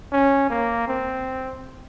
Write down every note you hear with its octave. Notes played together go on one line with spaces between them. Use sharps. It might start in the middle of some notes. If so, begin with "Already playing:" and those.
C#4
A#3
C4